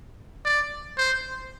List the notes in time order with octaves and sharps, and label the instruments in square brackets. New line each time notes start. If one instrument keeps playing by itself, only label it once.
[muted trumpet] D5
C5